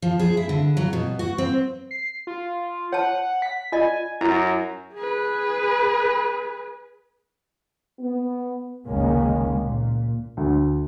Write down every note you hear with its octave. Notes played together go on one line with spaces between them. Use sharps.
F3
G#4
E4
D3
F#3
B2
F#4
C4
C7
F4
C#5 F#5 A5
B6
F4 D5 D#5 G#5
F#2 E4 A#5
G#4 B4
B3
F1 C#2 D#3 G#3 A#3 C#4
A#2
D2